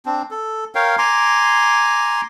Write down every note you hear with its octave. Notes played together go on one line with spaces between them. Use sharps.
C4 D4
A4
A#4 C#5 F5 G5
G#5 A#5 C6 D6